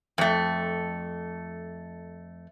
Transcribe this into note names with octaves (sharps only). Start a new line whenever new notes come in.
F2 A3